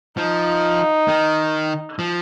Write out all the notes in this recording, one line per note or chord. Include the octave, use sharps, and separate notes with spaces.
F3 D#4
D#3
F3